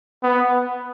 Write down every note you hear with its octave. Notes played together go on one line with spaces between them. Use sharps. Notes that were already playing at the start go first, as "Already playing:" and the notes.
B3